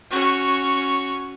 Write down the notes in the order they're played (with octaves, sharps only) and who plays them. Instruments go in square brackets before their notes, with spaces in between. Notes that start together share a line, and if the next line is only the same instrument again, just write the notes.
[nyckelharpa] C#4 F#4